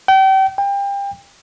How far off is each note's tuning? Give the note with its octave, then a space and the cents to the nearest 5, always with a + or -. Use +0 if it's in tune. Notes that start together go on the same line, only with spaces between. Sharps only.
G5 -35
G5 +30